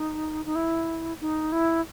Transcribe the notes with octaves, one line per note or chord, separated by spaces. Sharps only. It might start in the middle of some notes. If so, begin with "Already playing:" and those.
Already playing: D#4
D#4
E4
D#4
E4